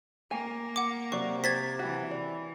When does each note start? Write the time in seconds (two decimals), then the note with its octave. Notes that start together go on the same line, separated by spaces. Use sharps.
0.31 A#3 G#5
0.76 F#5 D6
1.12 C3 F#3 F#4 D5 C#6
1.44 C5 G#6 A6 B6
1.79 E3 F#4
2.11 D5